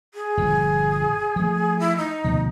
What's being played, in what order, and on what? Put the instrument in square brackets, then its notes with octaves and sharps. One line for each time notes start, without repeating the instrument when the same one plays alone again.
[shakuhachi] G#4
[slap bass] G1 A#2 F3
F3 A3
[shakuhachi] E4
D#4
[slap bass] D2 B2 F3